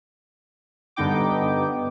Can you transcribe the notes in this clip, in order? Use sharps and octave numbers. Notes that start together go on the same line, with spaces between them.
G2 D3 B3 D#4 G5 D6